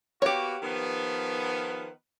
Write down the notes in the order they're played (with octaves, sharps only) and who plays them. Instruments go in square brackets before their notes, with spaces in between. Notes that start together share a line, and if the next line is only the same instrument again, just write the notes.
[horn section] A#3 B3 F#4 [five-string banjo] G4 C#5
[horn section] D#3 F3 B3